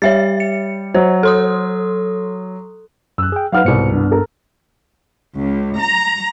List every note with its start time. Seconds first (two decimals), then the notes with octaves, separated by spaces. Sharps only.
0.02 G3 C#5 E5 A6
0.40 C#7
0.94 F#3 C5
1.23 A4 C6 D#6
3.18 F#2 E6 F#6
3.32 G#4 G5
3.52 F#3 D#4 B4 F5 F#5 F6
3.65 C2 G#2 B2 C5 C#7
3.92 G2 B3 D4
4.11 A4 A#4
5.35 C#2
5.77 A#5